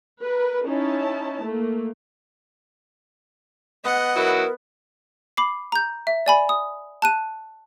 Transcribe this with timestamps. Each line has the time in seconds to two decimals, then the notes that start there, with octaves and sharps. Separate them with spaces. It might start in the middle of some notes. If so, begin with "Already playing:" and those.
0.21 A#4 B4
0.66 C#4 D#4 E4 A5
1.43 A3 A#3
3.85 B3 D#5 F#5
4.16 F#3 E4 F#4 A#4
5.37 B5 D6 C7
5.72 A#5 G6
6.07 E5
6.26 D5 G#5 B5
6.49 D#6
7.02 A5 F#6 D#7